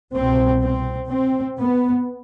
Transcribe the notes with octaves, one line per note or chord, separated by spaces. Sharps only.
C2 B2 C4
C4
C4
B3